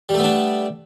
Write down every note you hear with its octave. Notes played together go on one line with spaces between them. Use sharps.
G3 A3 B3 D4